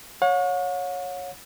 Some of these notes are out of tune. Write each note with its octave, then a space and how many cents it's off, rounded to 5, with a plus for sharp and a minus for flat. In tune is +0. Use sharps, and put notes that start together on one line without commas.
C#5 +0 F#5 -45